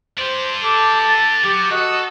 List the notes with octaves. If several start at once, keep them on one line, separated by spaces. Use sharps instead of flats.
D4 G4 C5
A4 D6
A6
F#3 G4
F#4 A4 D#5